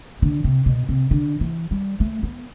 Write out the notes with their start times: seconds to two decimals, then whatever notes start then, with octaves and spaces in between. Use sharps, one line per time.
0.22 D3
0.44 C3
0.66 B2
0.89 C3
1.11 D3
1.41 E3
1.71 G3
2.00 A3
2.23 B3